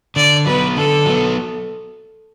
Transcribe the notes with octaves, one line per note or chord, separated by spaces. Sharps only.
D3 D5
F#3 B3 B4
D3 A4
F#3 B3